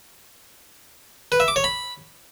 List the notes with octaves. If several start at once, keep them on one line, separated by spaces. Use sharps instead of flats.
B4
E5
D6
C#5
B5